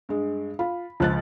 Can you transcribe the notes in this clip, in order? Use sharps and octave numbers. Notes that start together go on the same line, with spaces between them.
G2 G#3
F4 B5
C#2 F3 A5 F#6 A6